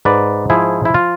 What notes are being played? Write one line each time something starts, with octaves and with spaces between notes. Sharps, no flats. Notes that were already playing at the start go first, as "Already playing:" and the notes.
G#2 B4 D5
F3 E4 G#4
E4
F4